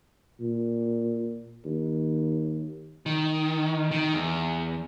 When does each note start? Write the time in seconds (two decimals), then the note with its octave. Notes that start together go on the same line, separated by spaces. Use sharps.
0.40 A#2
1.65 D#2
3.06 D#3
3.91 D#3
4.14 E2